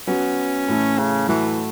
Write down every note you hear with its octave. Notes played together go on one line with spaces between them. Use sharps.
F#3 B3 C#4 F#4
A2 E3 A3
C#3
A2 E3 F#3 A3